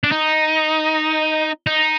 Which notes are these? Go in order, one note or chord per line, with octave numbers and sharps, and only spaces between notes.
D4
D#4
D#4